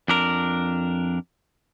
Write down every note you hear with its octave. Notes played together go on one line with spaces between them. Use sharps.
F2 D4 A#4